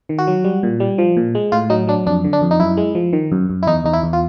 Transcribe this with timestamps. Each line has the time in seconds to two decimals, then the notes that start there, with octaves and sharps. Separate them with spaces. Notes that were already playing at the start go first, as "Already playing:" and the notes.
0.09 D#3
0.18 F#4
0.27 F#3
0.44 G3
0.63 A#2
0.80 G3
0.98 F3
1.17 A#2
1.35 G#3
1.52 A2 F4
1.70 F#3 D#4
1.87 F#3 D4
2.06 F2 D4
2.24 D3
2.33 D4
2.42 F2
2.51 D#4
2.60 F#2 E4
2.77 G#3
2.95 F3
3.13 D#3
3.32 F#2
3.50 F#2
3.63 E4
3.67 E2 D#4
3.84 E2 D#4
3.93 E4
4.03 E2
4.13 F4